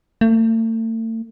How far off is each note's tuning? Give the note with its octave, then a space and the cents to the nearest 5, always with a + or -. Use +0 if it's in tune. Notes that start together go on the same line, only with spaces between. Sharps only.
A3 +40